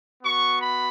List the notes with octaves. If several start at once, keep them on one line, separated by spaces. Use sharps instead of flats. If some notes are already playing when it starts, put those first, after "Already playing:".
B3 F#4 C#6
B5